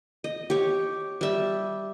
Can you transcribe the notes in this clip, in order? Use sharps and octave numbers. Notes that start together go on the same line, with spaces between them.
D#5
G4 C#5
G3 E5